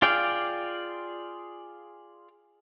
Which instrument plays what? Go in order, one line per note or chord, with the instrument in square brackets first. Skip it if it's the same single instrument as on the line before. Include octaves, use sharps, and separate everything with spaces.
[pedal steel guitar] F4 G#4 D5 F5 G5